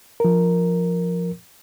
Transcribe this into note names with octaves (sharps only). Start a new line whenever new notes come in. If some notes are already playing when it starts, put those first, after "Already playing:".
F3 A#4